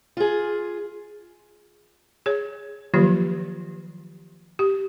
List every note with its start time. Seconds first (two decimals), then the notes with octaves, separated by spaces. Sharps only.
0.17 F4 G#4
2.26 G#4 C#5
2.94 D#3 F3 F#3 A#3 F4 G4
4.59 G4